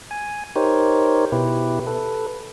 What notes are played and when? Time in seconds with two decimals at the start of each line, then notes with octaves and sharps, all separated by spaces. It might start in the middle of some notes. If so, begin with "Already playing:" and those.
0.11 G#5
0.56 D#4 G4 A#4 C5 C#5
1.32 B2 E4 G4 B4
1.87 A4 B4